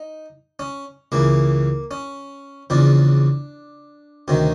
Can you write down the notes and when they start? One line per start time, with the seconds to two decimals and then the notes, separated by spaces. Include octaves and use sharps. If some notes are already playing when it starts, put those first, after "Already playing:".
Already playing: D#4
0.59 C#4
1.12 C#2 C#3 E3 A#3
1.91 C#4
2.70 E2 C#3 F3 D4
4.28 D2 C3 D#3 F#3